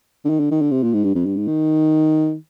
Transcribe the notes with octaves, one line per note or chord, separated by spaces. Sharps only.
D3
D#3
D3
D#3
D3
C3
A#2
G#2
G2
F2
G2
G#2
D#3